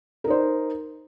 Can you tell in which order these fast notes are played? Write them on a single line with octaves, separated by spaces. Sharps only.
A#4 D#4 C5